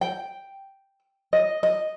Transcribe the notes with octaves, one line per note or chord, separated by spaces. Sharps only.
G5
D#5
D#5